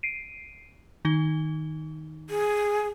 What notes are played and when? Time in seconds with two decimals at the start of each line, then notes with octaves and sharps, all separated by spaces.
0.03 C7 D7 D#7
1.05 D#3 D#4 G7
2.30 G#4